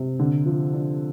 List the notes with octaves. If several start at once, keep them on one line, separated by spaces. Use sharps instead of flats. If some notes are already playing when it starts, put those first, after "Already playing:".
Already playing: C3
D3
F3
D4